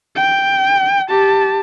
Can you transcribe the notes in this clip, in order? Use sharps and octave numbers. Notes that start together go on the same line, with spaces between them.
G5
G4 A5